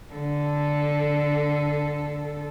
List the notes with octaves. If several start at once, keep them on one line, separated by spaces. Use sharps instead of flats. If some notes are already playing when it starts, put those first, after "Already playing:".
D3 A4